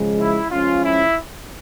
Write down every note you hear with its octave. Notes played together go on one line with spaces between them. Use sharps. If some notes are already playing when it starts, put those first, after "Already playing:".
Already playing: C#3 F3 G#3
E4
F3 G#3 C#4 F4
E4